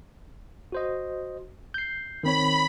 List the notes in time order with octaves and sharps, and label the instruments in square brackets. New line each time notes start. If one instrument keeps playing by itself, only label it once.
[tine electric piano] F#4 C5 D#5
G6 C7
[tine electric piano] D#3 C4 C#5 [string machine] B5